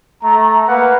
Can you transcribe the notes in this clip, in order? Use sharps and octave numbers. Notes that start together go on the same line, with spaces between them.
A3 A#5
A#3 B4 F#5